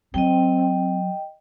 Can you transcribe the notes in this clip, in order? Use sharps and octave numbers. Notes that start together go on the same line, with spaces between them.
F#3 C4 D#5 G5